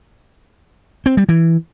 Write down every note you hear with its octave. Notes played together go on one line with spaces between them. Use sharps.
C4
G3
E3